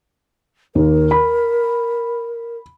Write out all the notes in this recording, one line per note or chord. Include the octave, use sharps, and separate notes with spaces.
D#2 A#4
B5